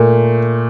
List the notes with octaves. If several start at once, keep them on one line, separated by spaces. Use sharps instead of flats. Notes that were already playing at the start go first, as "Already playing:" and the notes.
Already playing: A#2 A3